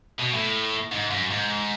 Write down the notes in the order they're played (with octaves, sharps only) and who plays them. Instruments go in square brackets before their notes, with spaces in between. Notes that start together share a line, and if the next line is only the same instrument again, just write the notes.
[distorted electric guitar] B2
A2
G#2
F#2
G#2